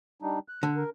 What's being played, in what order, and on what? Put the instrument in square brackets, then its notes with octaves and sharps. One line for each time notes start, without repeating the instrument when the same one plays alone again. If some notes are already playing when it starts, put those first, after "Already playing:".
[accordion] G3 D4 D#4
F#6
[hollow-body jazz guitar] D3
[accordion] A#4